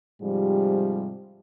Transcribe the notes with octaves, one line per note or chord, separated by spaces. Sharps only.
G#2 C3 F3 G3